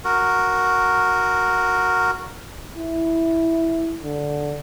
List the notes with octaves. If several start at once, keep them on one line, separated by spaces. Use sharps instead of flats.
F#4 A#4
E4
D3